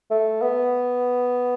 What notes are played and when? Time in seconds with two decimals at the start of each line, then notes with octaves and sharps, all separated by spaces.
0.10 A3
0.41 B3